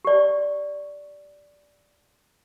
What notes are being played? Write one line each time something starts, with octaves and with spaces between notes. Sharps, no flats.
G4 D5